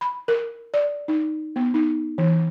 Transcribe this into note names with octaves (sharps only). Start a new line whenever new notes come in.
B5
A#4
D5
D#4
B3
D#4
E3